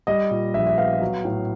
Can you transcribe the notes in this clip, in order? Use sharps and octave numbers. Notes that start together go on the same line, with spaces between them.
G3 D#5
A#2
A#1 E5
E5
B3 F5
F#3
A2